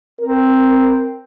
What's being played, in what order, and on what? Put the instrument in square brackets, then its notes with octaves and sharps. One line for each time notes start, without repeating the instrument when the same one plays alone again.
[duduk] C4 [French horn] A#4